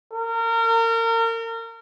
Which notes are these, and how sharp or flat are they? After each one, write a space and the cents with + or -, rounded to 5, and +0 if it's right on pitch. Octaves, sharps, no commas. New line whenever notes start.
A#4 -30